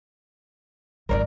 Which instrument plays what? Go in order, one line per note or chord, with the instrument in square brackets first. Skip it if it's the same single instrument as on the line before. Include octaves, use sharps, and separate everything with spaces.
[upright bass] G#1 F2 [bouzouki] A#4 C#5 D5